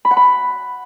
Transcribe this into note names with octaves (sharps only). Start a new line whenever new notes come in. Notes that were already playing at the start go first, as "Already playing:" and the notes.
B5
F#5
B5